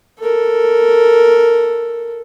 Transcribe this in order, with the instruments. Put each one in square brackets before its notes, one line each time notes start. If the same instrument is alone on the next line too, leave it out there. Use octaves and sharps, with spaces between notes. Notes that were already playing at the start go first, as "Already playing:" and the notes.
[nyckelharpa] A4 A#4